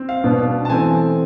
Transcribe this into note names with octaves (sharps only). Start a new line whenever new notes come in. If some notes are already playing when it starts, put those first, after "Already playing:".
Already playing: C4
F5
B2 B3 D4
A5
E3 A3 C4 G#5